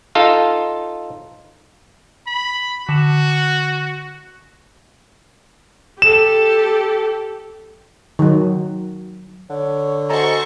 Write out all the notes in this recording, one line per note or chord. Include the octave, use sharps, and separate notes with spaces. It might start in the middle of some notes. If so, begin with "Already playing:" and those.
D#4 F4 A4 F5
B5
D3 F#4 E7
G4 A4 E7
D#3 F#3
D3 C#5
F#4 A4 C5 D#5 G#5 A#5 C#6